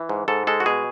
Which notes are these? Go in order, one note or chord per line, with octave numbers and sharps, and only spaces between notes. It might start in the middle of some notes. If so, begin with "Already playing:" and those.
Already playing: E3
G#2
G#2 A4
G#3 A4
F#4
B2 G#4